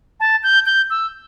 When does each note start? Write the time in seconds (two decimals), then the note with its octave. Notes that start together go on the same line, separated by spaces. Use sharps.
0.20 A5
0.43 G6
0.66 G6
0.90 E6